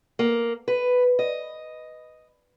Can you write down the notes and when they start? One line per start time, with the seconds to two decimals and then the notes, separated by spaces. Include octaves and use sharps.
0.19 A#3
0.68 B4
1.19 D#5